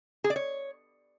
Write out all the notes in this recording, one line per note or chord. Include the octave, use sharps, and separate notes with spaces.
G#4
D5
C#5